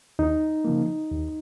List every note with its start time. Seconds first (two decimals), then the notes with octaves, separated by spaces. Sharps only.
0.19 D#2 D#4
0.65 C#3 F3 A#3
1.11 D#2